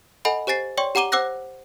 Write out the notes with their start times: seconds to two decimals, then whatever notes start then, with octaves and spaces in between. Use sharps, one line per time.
0.25 A4 D#5 F#5 G#5 B5
0.47 G4 C5 G#5 A6 C7
0.77 C#5 D5 G5 C6 C#6
0.95 G4 F#5 A#5 D6 D#7 G7
1.12 C5 F#5 D6 E6 F#6 A#6